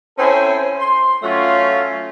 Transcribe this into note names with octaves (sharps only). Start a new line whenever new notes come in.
C4 C#4 E4 A4 C5 G#5
C6
F#3 A3 C#4 F4